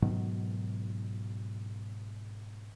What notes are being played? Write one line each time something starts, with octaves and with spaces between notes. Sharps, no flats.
G#2 B2 D#3 F#3